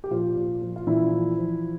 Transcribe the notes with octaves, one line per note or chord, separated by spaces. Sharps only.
G4
A#2 F3 F4
A#2
F3
F4
A#2 E3 E4
F3
F3